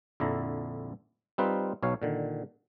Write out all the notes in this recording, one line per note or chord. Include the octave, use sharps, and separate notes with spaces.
A#1 F2 D3 E4 A#5
G3 C4 D#4 F4 B4 F5
B1 B2 C#5 F5
A#2 D3 D#3